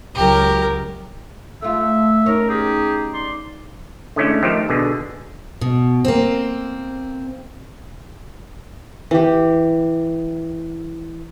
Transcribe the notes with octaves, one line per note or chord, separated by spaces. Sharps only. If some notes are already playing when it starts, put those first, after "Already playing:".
C#2 F#3 G4 A#4
A3 F4 E5
C#4 D#4 A#4
G4 G#4
D5 C6
D3 G#3 A3 C#4 E4
D#3 F3 A3 D#4 G4 C5
B2 D3 G#4
B2
A#3 C4
E3 G4